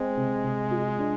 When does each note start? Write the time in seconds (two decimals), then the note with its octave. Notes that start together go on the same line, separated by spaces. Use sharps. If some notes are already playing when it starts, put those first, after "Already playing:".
Already playing: G#3 C4
0.17 C3
0.44 C3
0.71 F4
0.99 D4